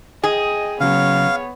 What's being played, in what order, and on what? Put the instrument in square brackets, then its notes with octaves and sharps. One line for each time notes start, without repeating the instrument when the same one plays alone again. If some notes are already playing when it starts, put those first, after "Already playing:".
[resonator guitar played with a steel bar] G#4 [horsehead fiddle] D#5 G5
[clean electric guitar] C#3 F#3 [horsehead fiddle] B3 C#5 [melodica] F5